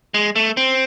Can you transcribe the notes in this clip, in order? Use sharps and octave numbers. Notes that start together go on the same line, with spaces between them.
G#3
A3
C4